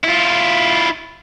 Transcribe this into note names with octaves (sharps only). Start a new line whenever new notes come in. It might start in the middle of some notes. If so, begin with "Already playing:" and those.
E4 F4